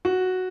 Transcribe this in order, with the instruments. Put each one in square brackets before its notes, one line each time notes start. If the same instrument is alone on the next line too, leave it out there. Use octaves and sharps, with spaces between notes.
[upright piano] F#4